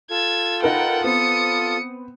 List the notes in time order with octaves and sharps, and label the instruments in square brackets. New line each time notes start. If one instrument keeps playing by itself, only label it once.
[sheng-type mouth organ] F4 A4 [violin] E6 G#6
[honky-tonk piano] D#4 A#4 B4 [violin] F#5 G5
[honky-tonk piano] B3 C4 [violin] D#6 C#7